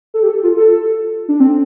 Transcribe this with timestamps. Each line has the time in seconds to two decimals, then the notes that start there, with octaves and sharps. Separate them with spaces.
0.14 A4
0.23 G4
0.29 A4
0.43 F4
0.57 A4
1.28 D4
1.40 C4